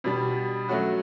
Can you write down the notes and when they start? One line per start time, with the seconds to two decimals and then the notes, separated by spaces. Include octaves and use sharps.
0.04 B2 G3 D4
0.69 F#3 A3 C#4 F#4